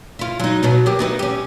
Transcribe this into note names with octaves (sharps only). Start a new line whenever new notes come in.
E4 F4
F#3 D#4
B2 F#3 B3
F#3 A#3 G4
B3 D#4 E4
C#4 G4